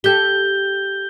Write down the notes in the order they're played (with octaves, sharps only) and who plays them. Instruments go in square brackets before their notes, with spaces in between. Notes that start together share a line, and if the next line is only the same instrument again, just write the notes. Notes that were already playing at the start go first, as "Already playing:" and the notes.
[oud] G4 A4 [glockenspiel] G6 G7